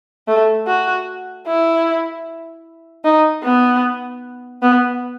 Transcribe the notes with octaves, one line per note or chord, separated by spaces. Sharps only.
A3
F#4
E4
D#4
B3
B3